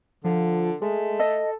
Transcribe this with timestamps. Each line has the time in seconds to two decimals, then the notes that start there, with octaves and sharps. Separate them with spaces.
0.24 D3 F3
0.82 G#3 A3
1.20 A4 D#5